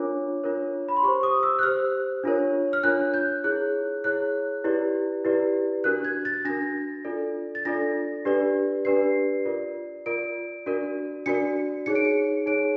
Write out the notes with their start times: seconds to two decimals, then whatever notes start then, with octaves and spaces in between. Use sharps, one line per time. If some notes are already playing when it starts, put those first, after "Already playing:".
Already playing: D4 F4 A#4 C#5 D6
0.44 D4 F4 A#4 C#5
0.88 B5
0.97 C6
1.03 G4 C5 C#6
1.23 D#6
1.43 E6
1.59 F#6
1.63 G4 C5 F6
2.24 D4 F4 A#4 C#5
2.73 F6
2.83 D4 F4 A#4 C#5 F#6
3.14 G6
3.44 E4 G#4 C#5 F#6
4.04 E4 G#4 C#5 F#6
4.64 E4 G4 B4 D5
5.25 E4 G4 B4 D5
5.84 D4 F#4 A#4 F#6
6.04 G#6
6.25 A6
6.45 D4 F#4 A#4 A#6
7.05 D4 F4 A4 D5
7.55 A6
7.65 D4 F4 A4 D5 A#6
8.25 D4 G4 B4 D5
8.85 D4 G4 B4 D5 C7
9.45 F4 A#4 D5
10.06 F4 A#4 D5 D7
10.66 D4 F#4 A#4 D5
11.26 D4 F#4 A#4 D5 C#7
11.86 D#4 G#4 C#5 C#7
11.95 D7
12.05 C#7
12.46 D#4 G#4 C#5 D7